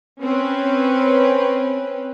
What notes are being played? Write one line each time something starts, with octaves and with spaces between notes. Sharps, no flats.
C4 C#4 B4